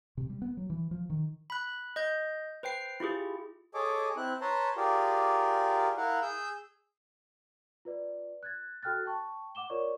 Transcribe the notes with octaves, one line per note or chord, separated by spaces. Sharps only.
C3
G3
B3
F#3
E3
F3
D#3
B5 F#6
D#5 G6
B4 C5 G5 C7
E4 F4 G4 G#4
G#4 A4 C#5 D#5 D6
C4 E4 F#6
B4 C#5 A5 A#5 C6
F4 G4 G#4 A#4 D5
E4 A#4 F5 F#5
G#4 E6 G6
F4 B4 D5
F#6 G#6 A6
F#4 A4 G5 F6 F#6 A6
G5 A5 C#6
F#5 D6 E7 G7
F4 A#4 C#5 D5 C#6